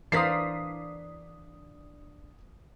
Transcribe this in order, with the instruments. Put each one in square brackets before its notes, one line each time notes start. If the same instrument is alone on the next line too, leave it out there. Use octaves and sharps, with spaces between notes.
[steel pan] E3 A#4 C5 [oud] D4 F5 [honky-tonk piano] D#6 B6 C7